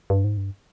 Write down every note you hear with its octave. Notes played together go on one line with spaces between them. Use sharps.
G2
G#2
G2